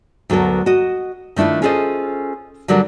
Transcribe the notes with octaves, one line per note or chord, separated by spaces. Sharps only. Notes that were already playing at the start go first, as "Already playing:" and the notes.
D2 F#3 B3 A4 A#4
F#4 D#5
D#3 A3 D4 E4 F4
C#4 F4 G#4 A4 C5 D#5
D3 F#3 G3 D4 A#4